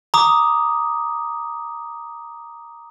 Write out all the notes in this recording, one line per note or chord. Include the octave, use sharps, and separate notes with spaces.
A#5 D6 D#6